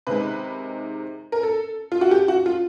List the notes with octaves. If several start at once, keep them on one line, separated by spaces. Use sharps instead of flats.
C3 D#3 G#3 B4
A#4
A4
F4
F#4
G4
F#4
F4